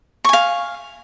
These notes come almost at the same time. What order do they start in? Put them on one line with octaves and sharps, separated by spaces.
C#6 G#5 F5